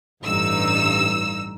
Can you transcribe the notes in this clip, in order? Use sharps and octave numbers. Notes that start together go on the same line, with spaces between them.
A1 G2 D#4 E6